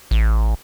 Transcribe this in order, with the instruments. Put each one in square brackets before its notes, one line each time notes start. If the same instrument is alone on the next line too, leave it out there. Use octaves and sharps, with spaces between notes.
[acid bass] A1